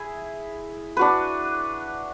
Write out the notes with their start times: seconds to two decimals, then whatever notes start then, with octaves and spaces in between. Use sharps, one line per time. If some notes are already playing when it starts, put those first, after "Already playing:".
Already playing: E4 G#4
0.97 D4 F#4 B4